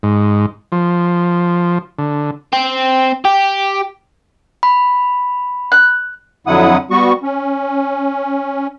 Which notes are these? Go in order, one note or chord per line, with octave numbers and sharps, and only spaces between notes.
G#2
F3
D3
C4
G4
B5
F#6
F2 D3 F#3 E4 F#5 D#6
G3 B3 F#4 C#6
C#4